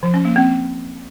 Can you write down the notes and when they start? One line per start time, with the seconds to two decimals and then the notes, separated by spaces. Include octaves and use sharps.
0.03 F3
0.14 C#4
0.25 A#3
0.36 C4